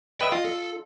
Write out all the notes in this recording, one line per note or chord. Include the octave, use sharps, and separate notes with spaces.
B4 D#5 E5 G5
F4 D#5
A4